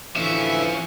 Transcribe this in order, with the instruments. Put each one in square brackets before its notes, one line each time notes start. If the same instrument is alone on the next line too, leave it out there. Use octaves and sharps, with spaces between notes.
[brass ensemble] D2 A2 E3 [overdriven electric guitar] F3 C#4 [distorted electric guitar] E5